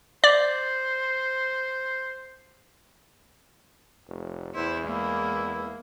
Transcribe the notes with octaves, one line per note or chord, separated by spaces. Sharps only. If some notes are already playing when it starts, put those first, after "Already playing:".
C5 D5
F1
E2 E4 C5
G#3 A#3 E4